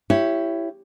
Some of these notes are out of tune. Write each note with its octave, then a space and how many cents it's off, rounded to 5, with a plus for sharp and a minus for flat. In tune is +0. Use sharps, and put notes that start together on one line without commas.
E4 +15 G4 +0 C#5 +0